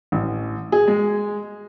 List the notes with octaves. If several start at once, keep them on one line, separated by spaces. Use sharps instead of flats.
A1
G#4
G#3